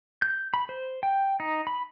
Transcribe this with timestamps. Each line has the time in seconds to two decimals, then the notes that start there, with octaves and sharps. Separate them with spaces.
0.22 G6
0.54 B5
0.69 C5
1.03 G5
1.40 D#4
1.67 B5